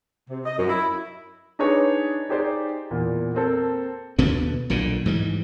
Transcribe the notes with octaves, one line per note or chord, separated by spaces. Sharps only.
C3
D#5
F#2
E4
D4 D#4 G#4 B4 C#5 D5
D#4 G4 G#4 C5 D5
E2 A#2
A#3 C4 A4
D#2 B2 D3 B3
B1 A#2 D3
G#2 E3 G3